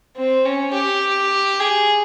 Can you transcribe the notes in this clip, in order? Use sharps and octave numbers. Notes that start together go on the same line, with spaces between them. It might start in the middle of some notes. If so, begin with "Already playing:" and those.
C4
C#4
G4
G#4